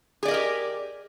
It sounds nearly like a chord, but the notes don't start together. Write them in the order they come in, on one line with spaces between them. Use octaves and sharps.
G#4 D5 D#5 A#4 G4